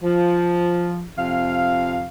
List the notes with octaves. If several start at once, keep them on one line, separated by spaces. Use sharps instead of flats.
F3
F2 C3 F5